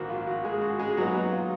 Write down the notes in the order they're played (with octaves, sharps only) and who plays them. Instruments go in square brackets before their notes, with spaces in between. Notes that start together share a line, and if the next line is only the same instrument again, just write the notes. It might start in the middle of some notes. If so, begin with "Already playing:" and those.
Already playing: [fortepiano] A#1 G#2 D#3 A#3 F#4 A#4
F4
F#4
G#3 G#4
F#4
G#3 G#4
A#2 F#3 B3 D#4 F#4
F#4
F4